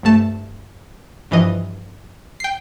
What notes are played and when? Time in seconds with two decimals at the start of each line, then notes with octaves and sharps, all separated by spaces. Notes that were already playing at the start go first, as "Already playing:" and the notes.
0.03 C2 G2 A3 A5
1.31 G2 E3 F3 D#5
2.40 G5 C7